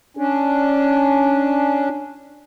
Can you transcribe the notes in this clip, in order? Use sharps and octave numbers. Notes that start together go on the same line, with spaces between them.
C#4 D4